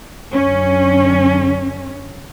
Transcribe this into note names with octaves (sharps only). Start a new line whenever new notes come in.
F#2 D3 C#4